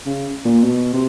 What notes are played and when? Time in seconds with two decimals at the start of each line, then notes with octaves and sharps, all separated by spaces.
0.06 C#3
0.45 A#2
0.64 B2
0.93 C3